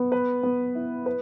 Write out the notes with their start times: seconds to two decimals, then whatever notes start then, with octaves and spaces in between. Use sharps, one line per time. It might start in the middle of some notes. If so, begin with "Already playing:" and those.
Already playing: B3
0.12 B4
0.43 B3
0.75 E4
1.06 B4